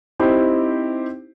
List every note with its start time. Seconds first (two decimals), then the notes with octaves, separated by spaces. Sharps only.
0.20 C4 D#4 E4 G4 C5